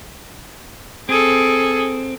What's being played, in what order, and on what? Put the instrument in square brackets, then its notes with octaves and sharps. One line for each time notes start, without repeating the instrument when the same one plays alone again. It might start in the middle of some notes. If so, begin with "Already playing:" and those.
[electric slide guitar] C4 [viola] G#4 A4